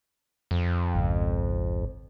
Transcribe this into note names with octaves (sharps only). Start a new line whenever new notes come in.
F2
G#1 C#2